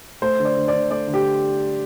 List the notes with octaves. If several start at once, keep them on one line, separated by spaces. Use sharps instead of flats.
A3 C5
D3
D5
D3
D5
D3
A3 D5
D3
G4